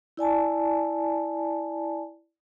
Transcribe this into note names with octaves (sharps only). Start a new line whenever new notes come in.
E4 D5 G#5 A5